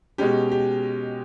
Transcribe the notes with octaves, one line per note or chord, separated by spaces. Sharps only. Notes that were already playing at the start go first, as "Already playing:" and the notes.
B2 G#3 C#4 G4
G4